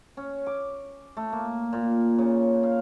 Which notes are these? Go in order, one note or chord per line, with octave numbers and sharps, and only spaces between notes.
C#4
D6
A3
A#3
A#2
C#3
F5